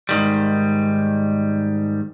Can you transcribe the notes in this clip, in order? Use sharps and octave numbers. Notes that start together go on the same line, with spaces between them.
G#2 D#3 G3